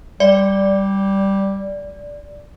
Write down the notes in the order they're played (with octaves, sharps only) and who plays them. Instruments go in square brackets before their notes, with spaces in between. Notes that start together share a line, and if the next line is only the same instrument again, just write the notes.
[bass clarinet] G3 [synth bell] D5